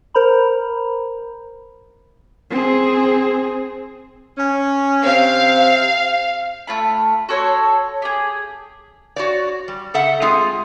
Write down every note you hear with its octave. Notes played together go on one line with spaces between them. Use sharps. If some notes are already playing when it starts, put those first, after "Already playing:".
A#4 C5 A#5 B5
C4 G#4
C#4
C3 C4 F5
A3 F4 B5
F#4 A4 C#5 C6
G4 G#4
F#4 C#5 D5
G3
C#3 A4 E5 F#5
G#3 A3 C4 F4 G#4